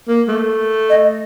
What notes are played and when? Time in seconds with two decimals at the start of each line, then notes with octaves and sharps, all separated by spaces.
0.08 A#3
0.28 A3
0.90 D#5